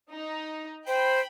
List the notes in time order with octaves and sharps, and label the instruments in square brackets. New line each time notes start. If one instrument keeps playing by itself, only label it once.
[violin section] D#4
[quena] C5 [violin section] G5 B5